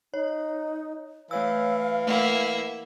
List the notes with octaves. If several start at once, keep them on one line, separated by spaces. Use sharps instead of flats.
D#4 C#5
E3 A3 C#5 F5 E6
A3 A#3 E4 F#5